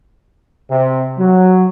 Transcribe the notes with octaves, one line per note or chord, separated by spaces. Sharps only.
C3
F#3